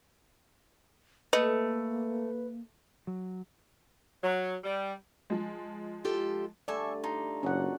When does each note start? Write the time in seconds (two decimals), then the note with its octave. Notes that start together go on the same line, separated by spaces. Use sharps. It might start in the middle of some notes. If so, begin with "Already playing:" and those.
1.33 A3 A#3 B4 D#5
3.07 F#3
4.23 F#3
4.64 G3
5.30 F3 G#3
6.05 F4 G4 A4
6.68 D3 G3 A3 A4 D5 E5 G#5
7.04 D#4 F4 A5
7.43 F#1 A#2 D3 F#3 C#4 F#5